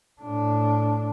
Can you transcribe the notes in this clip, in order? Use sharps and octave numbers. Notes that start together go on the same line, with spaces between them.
A2 D4